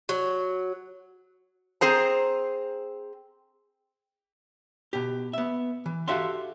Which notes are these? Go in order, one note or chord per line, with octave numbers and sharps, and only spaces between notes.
F#3
C4 G#4 C5 A#5
B2 G4
B3 E5
E3
F#4 G4 A4 E5 F5 C6